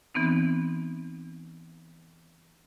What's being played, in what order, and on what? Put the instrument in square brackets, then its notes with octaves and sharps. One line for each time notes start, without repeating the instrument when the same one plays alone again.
[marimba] E3 B3 C4 D#4